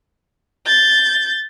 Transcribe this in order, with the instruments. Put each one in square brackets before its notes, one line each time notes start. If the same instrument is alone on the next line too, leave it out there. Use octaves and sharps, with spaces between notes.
[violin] G6 A6